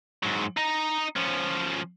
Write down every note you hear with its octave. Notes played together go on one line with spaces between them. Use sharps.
G#2 F#3
D#4 D#5
F3 C#4